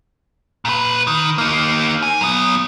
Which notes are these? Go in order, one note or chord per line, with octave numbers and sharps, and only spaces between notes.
A#2 B4
D#3
A#3 D#4
G#5
F#3 B3